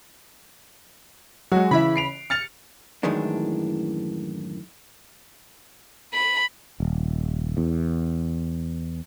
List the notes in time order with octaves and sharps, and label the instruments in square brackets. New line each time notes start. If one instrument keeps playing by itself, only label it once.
[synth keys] F#3 G#3 [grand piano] F#4
[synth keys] C#3 B5 [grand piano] E3 E4 E5
[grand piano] C7 D7 F7
[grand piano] F6 A6 F7 [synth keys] C#7
[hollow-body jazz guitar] F#2 A2 D#3 E3 G#3 D4
[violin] B5
[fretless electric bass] D#1
E2